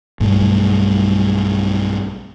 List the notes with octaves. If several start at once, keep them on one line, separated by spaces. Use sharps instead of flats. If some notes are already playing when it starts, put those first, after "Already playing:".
B1 G2 G3 A3